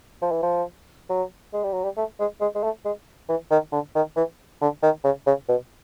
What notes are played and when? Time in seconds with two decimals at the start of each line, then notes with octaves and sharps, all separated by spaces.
0.22 F3
0.31 E3
0.42 F3
1.09 F#3
1.53 G#3
1.63 G3
1.73 F#3
1.83 G3
1.97 A3
2.19 G#3
2.41 G#3
2.55 G#3
2.63 A3
2.85 G#3
3.29 E3
3.51 D#3
3.72 D3
3.95 D#3
4.16 E3
4.61 D3
4.83 D#3
5.04 C#3
5.26 C#3
5.49 B2